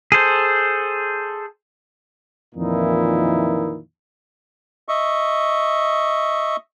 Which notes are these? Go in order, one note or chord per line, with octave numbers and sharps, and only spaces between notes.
G#4 A4 C5
F2 A#2 D#3 E3 D#4 E4
D#5 E5 C#6